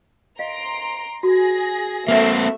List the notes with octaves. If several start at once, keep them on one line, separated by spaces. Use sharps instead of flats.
D#5 F5 A#5 C6 D7
F#4 G#4 A#6
A3 A#3 C4 A#4 E5